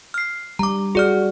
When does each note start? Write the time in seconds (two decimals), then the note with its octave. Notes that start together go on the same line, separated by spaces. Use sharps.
0.14 F6 C7
0.59 G3 A#5 D6
0.95 F#4 G#4 D5 F6